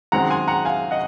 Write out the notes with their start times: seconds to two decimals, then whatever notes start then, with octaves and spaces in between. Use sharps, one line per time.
0.12 F#2 D#3 G#3 C4 F#5 A#5
0.30 G#5 C6
0.48 F#5 A#5
0.65 F5 G#5
0.91 D#5 F#5